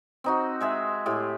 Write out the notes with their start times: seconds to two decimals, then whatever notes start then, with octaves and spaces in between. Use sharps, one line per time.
0.24 C4 D#4 F#4
0.61 G#3 G#4 E5
1.06 A2 G4 G#4